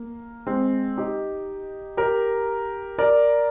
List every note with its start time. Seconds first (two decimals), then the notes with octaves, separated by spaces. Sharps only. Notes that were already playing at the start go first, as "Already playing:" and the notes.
Already playing: A#3
0.47 G#3 C4
0.97 D#4 G4
1.97 G4 A#4
2.98 A#4 D5